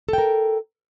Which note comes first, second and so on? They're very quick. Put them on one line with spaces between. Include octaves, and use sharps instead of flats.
A4 G5 A#4